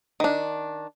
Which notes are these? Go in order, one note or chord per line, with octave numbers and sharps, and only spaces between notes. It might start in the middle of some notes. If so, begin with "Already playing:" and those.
D#3 D4